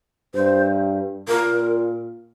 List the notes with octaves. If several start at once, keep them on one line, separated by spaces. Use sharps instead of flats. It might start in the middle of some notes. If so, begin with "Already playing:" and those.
G2 C5
A#2 A#4